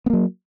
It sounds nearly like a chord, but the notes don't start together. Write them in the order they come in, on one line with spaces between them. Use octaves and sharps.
B3 A#3 F#3